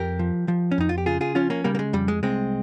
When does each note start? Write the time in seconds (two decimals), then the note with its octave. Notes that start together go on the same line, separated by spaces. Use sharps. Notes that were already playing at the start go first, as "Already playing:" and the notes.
Already playing: F2 G4 A#4
0.19 F3
0.48 F3
0.71 C#4
0.78 F2 D#4
0.89 F4
0.98 G4
1.06 C#3 F4 G#4
1.21 F4 G#4
1.35 F3 C#4 F4
1.50 A#3 C#4
1.64 C#3 G3 A#3
1.75 A#3
1.79 G#3
1.93 F2 G3
2.08 G#3
2.23 C2 G#3 C4